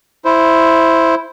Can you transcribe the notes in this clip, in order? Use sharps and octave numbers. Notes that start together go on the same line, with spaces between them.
E4 C5